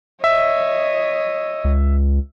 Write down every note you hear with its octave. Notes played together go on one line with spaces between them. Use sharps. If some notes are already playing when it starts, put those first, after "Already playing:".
C#5 D#5 E5
C#2